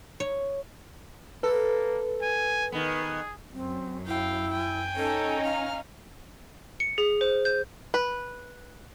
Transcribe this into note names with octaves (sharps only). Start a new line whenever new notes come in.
C#5
A#3 A4 B4
G#5
D#3 B3 G#4
F#2 C4
E4 F5 G5
G5 G#5
C#4 D#4 A4
F5 F6
C#7
G#4
C5
G6
B4